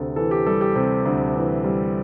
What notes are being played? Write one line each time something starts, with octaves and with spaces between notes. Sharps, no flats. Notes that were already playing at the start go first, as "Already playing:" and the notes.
Already playing: D2 C3 A4
E3 A4
G4
G3 A4
G4
C3
D2
E3
G3